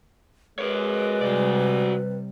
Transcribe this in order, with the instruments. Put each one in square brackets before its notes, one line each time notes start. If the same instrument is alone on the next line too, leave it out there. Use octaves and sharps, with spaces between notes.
[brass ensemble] G#3 [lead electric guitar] A#4 C#5 [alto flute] B4
[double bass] C3 G3 [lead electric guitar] F#4 D5